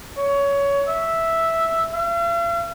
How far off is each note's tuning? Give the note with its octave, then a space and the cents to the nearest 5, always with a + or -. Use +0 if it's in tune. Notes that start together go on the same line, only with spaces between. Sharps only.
C#5 +20
E5 -5
F5 -45